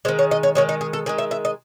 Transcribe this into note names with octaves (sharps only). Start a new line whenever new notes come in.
D#3 G#3 C5
C#5
D#5
C#5
D#3 G#3 C#5
D#4
G#4
A4
D#3 G#3 G#4
E5
E5
D#5